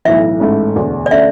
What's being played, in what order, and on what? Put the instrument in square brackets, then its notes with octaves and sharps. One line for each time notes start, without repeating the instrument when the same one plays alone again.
[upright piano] B1 A2 E3 [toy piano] E5
[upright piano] A1 G#2 E3 A3 E4
E1 D2 D3
[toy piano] D5
[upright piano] D3 A3 C#4 [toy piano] E5